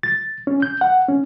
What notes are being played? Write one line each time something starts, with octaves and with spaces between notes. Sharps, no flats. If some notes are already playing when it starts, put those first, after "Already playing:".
A6
C#4
G6
F#5
C#4